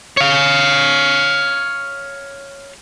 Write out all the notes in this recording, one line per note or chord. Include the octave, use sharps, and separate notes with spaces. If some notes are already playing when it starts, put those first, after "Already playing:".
C#5 F5